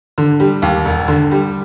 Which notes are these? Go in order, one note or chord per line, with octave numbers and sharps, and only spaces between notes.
D3
G3
D#2
E1
D3
G3